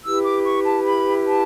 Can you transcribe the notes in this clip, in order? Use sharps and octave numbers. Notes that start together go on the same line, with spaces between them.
E4 G4 B4 E6
D6
C#6
A5
B5
A5